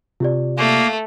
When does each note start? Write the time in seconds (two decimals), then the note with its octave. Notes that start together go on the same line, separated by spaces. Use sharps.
0.20 C3 F4 G4 D5
0.58 A3 A#3